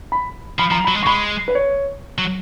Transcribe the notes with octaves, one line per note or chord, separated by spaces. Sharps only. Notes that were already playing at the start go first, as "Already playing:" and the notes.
B5
F3 B5
F3 A#5
B5
F#3
G#3
C#6
G#3 B5
B4
C#5
F#3